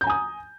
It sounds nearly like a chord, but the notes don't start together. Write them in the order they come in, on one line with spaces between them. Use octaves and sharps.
G6 A#5 G#5 D#6